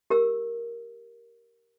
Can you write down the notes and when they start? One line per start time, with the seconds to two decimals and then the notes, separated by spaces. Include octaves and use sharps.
0.10 G4 A#4 E6